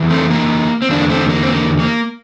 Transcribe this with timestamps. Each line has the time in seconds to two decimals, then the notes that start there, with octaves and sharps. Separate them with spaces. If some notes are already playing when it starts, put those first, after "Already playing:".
Already playing: F2 E3
0.10 A3 C4
0.30 A#3
0.82 C4
0.90 E2 D3 A#3 D4
1.09 A3 C4
1.29 A#3
1.43 C4
1.49 A#3
1.79 A#3